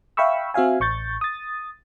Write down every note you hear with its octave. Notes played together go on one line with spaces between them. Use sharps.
E5 F5 G5 B5 C#6 E6
C4 F#4 E5 F5 G#5
A1 C#6 G6 A6
D#6 A6